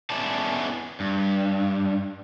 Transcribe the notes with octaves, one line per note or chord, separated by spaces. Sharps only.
B3 C#4 E4 G#4 D5 A5
G2